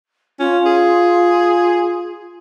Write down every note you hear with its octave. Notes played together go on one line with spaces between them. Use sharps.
C#4 F4
G#4